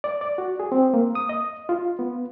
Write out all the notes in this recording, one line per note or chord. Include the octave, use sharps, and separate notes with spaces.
D5
D5
F#4
G#4
C4
A#3
D#6
D#5
F4
B3